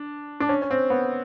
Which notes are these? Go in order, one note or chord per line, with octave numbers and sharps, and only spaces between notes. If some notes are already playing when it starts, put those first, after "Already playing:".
Already playing: D4
D4
C#4
C#4
C4
B3